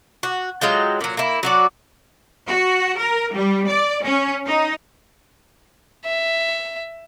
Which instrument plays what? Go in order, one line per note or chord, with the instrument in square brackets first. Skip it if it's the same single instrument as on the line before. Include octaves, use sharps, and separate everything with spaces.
[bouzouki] F#4
F#3 G#3 F4 G5
A#2 F#3
A#3 E4
F#3 F#4 D5
[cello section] F#4
A#4
G3
D5
C#4
D#4
[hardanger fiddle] E5